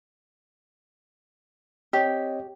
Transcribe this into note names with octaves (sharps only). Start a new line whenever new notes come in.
C4 G4 C#5 D#5